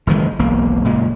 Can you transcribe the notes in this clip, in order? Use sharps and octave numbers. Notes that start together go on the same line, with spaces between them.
F#1 D#3 E3 G#3
E1 B1 A#3
F#1 A#2 G#3